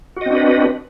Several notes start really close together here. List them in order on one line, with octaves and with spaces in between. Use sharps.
F#4 D#5 C4 D4 B4